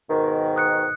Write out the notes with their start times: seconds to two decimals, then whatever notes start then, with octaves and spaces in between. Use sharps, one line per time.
0.09 G#2 B2 D#3
0.56 D#6 F#6 C#7